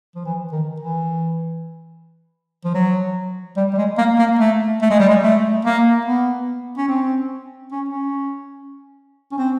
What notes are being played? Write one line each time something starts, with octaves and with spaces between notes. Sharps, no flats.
F3
E3
D#3
E3
F3
F#3
G3
G3
G#3
A#3
A#3
A3
A3
G#3
G3
G#3
A3
A#3
B3
C#4
C4
C#4
C#4
C#4
C4